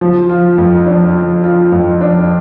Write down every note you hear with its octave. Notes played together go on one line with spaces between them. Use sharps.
F3
F4
F2
D4
F3
F4
F2
D4